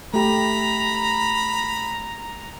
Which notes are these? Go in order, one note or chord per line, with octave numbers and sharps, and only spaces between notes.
A3 G4 A#5 B5